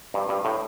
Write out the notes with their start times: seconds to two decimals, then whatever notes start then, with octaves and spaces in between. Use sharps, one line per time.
0.14 G2
0.29 G2
0.45 A2